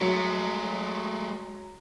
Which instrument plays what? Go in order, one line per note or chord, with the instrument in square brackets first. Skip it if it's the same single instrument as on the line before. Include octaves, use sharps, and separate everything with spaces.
[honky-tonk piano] F#3 C#7 [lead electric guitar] G#3 A3